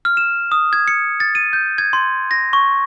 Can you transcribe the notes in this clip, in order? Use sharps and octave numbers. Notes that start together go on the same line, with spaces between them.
F6
E7
D#6
G#6
C#7
A6
D#7
G6
G#6
C6
A#6
C#6